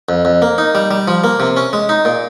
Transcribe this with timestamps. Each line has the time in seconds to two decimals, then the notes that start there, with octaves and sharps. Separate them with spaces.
0.09 F2
0.25 F2
0.42 A#3
0.58 D#4
0.75 G3
0.91 G3
1.08 F3
1.24 A#3
1.40 C3
1.57 C#4
1.73 G#3
1.89 D#4
2.05 A#2